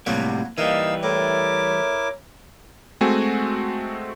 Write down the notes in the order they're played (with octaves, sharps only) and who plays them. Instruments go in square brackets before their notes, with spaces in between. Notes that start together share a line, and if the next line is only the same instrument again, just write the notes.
[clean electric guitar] A2 C3 G3 [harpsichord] F#3 A#3 B3
[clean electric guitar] E3 G3 [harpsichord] A#3 [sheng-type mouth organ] D#4 F5 E6 [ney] D#5
[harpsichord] A2 [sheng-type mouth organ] E4 A#4 D6 [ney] C#5
[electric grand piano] G#3 A3 C4 F#4 G#5